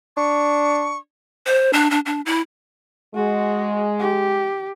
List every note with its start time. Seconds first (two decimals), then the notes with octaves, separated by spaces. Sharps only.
0.17 D4 C#6
1.46 C5
1.73 D4
1.91 D4
2.06 D4
2.26 E4
3.15 G#3 F#4
4.00 G4